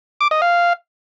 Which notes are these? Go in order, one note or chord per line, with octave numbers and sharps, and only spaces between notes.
D6
D#5
F5